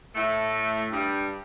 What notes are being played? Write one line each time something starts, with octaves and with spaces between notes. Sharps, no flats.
A2 A3
G2 G3